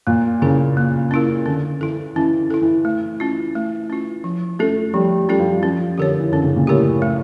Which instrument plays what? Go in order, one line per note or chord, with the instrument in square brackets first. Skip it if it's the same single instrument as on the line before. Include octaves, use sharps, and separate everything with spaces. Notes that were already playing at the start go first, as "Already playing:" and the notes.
[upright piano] A#2 [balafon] A#3
[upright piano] C#3 [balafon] C#4 E4 A#4
[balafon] A#3
C#4 E4 A#4
[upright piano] D3 [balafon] C#4
[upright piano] E3 [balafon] E4 A4
[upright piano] E3 [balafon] C#4
[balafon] E4 A4
[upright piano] E3
[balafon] A3
C#4 F4
A3
C#4 F4
F3
[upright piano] A3 [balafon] C#4 F4 A4
[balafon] F3 [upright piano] G3
[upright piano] G3 [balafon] C#4 F4 A4
[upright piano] F3
G3
[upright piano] F3 [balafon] C#4
[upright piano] D3 [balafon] G4 A#4 C#5
[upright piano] E3
[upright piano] D3 [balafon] C#4
[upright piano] C#3
A#2
[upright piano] A2 [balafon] G4 A#4 C#5
[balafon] A3